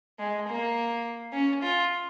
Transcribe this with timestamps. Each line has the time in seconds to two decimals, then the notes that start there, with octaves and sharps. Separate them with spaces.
0.19 G#3
0.48 A#3
1.33 C#4
1.62 F4